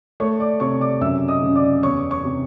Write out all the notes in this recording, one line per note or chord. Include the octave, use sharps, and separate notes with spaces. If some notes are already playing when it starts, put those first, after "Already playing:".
A3 C#5 C#6
D5 D6
C3 C#5 C#6
D5 D6
F#2 E5 E6
D#5 D#6
C#3
D5 D6
E2 C#5 C#6
C#5 C#6
C3